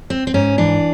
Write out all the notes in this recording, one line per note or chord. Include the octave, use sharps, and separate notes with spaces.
C4
C4
G#2 C#4
E3 D4